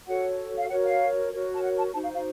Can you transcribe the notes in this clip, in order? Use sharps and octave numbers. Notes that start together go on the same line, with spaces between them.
F#4 A4 C#5 F#5
F5
F#4 A#4 C#5 F#5
F5
F#4 A#4 C#5
A5
F#5
A5
D#4 F#4 C5 A5
F5
F5